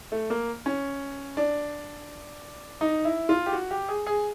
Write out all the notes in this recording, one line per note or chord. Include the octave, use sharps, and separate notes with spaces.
A3
A#3
C#4
D4
D#4
E4
F4
G4
F#4
G4
G#4
G#4